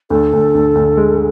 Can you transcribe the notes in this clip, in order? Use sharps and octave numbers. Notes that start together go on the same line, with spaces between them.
D2 A4
D2
D2
D2
G#3